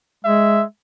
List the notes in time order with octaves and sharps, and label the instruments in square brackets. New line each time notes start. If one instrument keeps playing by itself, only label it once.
[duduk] G#3 [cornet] E5